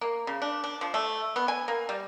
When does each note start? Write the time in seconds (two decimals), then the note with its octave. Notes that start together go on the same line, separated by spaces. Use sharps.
0.01 A#3
0.27 C#3
0.42 D4
0.64 D4
0.81 F3
0.94 A3
1.36 B3
1.48 G#5
1.68 A#3
1.89 G3